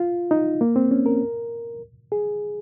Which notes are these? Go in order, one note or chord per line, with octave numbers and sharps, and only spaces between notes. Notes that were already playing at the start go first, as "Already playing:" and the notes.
Already playing: F4
D#4
A#3
C4
C#4
A#4
G#4